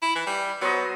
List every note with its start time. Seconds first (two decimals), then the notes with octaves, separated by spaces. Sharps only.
0.02 E4
0.15 E3
0.27 G3
0.61 F#3 B3 C5 D#5